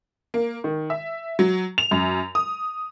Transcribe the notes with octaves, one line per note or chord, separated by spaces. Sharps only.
A#3
D#3
E5
F#3
F7
F#2
D#6